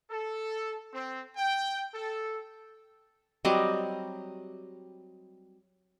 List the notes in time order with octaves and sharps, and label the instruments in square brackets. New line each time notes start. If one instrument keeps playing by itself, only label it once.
[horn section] A4
C4
G5
A4
[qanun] F#3 G3 C4 D#5